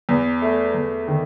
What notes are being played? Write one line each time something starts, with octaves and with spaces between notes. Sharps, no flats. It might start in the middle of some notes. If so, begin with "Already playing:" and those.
E2
A3
E2
D#3